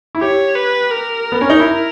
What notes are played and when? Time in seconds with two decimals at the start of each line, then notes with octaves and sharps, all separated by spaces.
0.15 E4
0.21 G4 C#5
0.56 B4
0.91 A#4
1.32 B3
1.41 C#4
1.50 D#4
1.59 E4 A#4